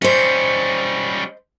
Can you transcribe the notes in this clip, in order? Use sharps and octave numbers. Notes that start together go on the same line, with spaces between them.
G3 C#4 C5 D#5